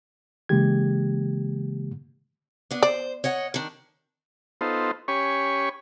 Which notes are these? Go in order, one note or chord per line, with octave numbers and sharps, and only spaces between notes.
C#3 E3 G#3 A#3 G4 G#6
B3 D4
C5 D5
C#5 D#5 F#5
D#3 D4
B3 D#4 F4 A4 C5
C#4 G4 C#5 G#5 B5 C#6